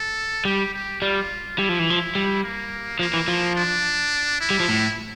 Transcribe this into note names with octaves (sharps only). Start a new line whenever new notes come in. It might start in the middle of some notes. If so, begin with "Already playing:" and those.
Already playing: A4
G3 G4
G4
G3 F4
G3 E4
F3
E3
F3
G3
A#3
F3 A#3
E3
F3
D4
E4
G3
F3
A2